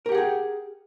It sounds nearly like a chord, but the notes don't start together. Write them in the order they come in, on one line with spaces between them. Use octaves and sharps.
A#4 G4 F#5 G#4 G5